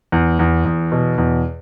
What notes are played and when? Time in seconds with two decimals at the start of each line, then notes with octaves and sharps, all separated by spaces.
0.12 E2
0.39 E2
0.65 E2
0.92 B2
1.18 E2